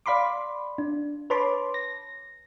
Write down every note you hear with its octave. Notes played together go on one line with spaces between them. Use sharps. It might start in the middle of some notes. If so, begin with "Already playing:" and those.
D5 F5 B5 C6 D6
D4
B4 C#5 A5 B5 C6 D6
A#6